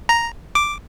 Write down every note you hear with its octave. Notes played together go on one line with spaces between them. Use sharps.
A#5
D6